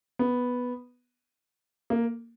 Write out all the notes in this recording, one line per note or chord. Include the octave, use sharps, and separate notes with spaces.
B3
A#3